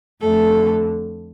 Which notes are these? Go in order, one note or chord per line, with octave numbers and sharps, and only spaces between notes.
F2 D3 A3 A4